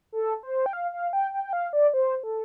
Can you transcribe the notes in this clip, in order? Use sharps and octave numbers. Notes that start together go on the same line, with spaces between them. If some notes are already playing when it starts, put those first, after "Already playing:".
A4
C5
G5
F5
F5
G5
G5
G5
F5
D5
C5
A4